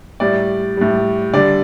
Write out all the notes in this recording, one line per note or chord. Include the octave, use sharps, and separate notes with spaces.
A2 G3 D5
A2 G3
D3 G3 D5